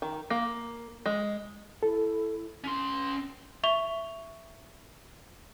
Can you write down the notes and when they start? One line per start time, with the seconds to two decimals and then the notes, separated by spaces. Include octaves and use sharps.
0.02 D#3
0.30 A#3
1.06 G#3
1.83 E4 A4
2.64 C#4 C6
3.64 E5 C#6 F7 G7